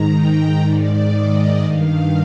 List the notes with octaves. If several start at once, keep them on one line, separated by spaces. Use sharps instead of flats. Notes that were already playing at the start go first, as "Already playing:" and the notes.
Already playing: G#2 D#3 A#5
G5
G#2 D#3 D5
D#5
G2 D#3 F5